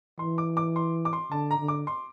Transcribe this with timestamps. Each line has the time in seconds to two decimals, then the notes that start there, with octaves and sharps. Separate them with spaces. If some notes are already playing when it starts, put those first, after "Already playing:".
0.19 E3 C6
0.38 D6
0.57 D6
0.76 C6
1.05 D6
1.13 C6
1.31 D3 A5
1.51 A#5
1.59 D3
1.68 D6
1.87 C6